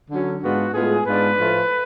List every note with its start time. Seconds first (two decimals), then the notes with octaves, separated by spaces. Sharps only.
0.11 D3 F#3 C#4
0.42 G#2 G#3 B3 D4 F4 F#4
0.73 A2 G#3 B3 F4 G#4
1.06 G#2 G#3 B3 D4 F4 B4
1.37 A2 F3 A3 F4